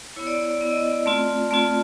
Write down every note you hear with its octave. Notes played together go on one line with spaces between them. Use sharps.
B3 E4 C#5
D5
D5
D5
B3 E4 D5
D#5
D5
A3 C4 F4
A3 C4 F4